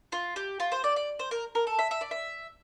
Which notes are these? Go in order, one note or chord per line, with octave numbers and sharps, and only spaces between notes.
F4
G4
F4
C5
D5
D5
C5
A#4
A#4
A4
E5
E5
D5
E5